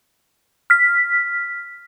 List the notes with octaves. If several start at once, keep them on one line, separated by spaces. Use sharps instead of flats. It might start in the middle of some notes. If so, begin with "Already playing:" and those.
F6 B6